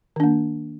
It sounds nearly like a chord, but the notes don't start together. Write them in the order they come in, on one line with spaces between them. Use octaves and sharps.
D#3 D4 A#3